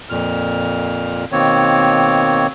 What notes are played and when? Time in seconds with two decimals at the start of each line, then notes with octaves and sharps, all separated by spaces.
0.10 F2 A#2 F6
1.32 B2 D#3 A#3 C4 C#5